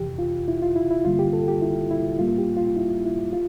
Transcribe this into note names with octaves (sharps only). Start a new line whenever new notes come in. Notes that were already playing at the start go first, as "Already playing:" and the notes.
Already playing: F2 C3 E3 G4
F4
E4
F4
E4
E4
G2 D3 G3 A#3 F4
G4
A4
G4
E4
E4
A2 G3 A#3 F4
G4
F4
E4
E4
F4